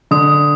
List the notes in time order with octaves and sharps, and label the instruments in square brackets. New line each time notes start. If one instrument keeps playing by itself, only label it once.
[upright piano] D3 [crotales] D#6